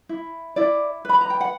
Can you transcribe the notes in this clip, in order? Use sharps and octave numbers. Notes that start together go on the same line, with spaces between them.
E4
E4 D5
B4 B5
A#5
G5
F#5